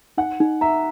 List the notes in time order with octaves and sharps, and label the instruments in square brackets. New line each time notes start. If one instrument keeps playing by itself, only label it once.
[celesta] D#4 [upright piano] F#5
[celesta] D#4
[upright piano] E5 [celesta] A#5